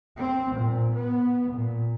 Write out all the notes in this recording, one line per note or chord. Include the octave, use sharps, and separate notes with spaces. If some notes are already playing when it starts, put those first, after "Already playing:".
C4
A#2
B3
A#2